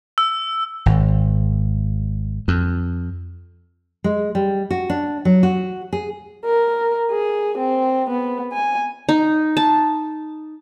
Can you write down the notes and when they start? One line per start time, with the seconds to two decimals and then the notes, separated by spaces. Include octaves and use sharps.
0.18 E6
0.86 G#1
2.48 F2
4.04 G#3
4.35 G3
4.71 F#4
4.90 D4
5.25 F#3
5.43 F#4
5.93 G#4
6.45 A#4
7.11 G#4
7.58 C4
8.10 B3
8.53 G#5
9.09 D#4
9.57 A5